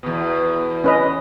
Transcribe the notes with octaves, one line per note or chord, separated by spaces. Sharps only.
E2 B2
C#4 B4 D#5